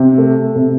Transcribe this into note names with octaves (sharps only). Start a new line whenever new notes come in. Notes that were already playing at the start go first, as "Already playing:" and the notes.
Already playing: C3
A3
C3